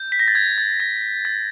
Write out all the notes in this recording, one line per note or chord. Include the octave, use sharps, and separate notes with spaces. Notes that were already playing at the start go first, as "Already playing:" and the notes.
Already playing: G6
B6
A#6
A6
G#6
A6
A#6
A6